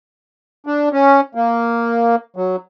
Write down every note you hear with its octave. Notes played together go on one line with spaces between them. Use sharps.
D4
C#4
A#3
F#3